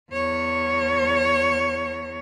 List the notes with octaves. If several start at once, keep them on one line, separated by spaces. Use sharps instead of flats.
E2 C#5